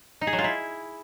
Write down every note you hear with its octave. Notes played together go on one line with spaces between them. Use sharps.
D#4
G#4
F#3
F4
E4